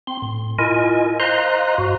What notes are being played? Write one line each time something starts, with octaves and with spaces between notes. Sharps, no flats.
C4 C6
A2
E4 F4 A#4 D#5 G#5
C5 D#5 F5 A#5 C6 F#6
G2 F#4